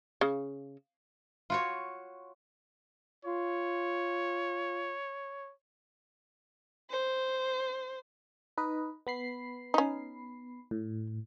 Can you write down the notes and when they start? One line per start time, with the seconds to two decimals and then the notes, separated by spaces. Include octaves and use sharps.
0.21 C#3
1.50 F4 F#4 C#5
3.25 F4 C#5
6.91 C5
8.58 D#4 B4 D#5
9.07 B3 B5 C7
9.74 C#4 D#4
10.71 A2